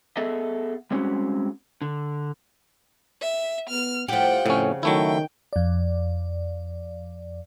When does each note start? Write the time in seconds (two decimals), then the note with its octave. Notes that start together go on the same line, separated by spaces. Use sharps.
0.17 B3 G#4 A4 D#5 E5
0.91 G3 G#3 C4 C#4 F#4
1.82 D3
3.22 E5
3.70 B3 F6
4.08 A2 F3 G4 F#5 G5
4.46 F2 A2 C#3 C#4
4.83 D#3 F#3 A3 E4 G5
5.53 F2 D5